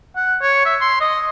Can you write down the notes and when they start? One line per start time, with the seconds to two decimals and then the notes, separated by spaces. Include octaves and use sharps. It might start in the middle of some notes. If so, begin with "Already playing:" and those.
0.16 F#5
0.41 C#5
0.65 E5
0.81 C6
1.00 D#5